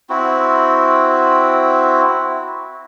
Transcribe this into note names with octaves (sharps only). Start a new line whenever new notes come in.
C4 E4 F#4